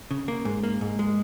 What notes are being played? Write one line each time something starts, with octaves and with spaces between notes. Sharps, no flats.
C#3
A#3
G#2
A#3
G#2
G#3